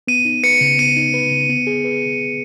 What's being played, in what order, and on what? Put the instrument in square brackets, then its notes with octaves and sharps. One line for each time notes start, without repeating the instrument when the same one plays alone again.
[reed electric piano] B3 [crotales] D#7
[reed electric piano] D#4
[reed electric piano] B4 [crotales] C#7
[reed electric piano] C#3
[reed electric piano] B3 [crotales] D#7
[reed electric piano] D#4
B4
C#3
B3
G#4
B4